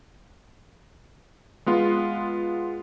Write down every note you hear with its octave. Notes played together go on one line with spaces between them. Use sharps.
G#3 B3 F4